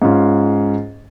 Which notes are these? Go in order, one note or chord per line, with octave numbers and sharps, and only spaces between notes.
G#2 C#4 F4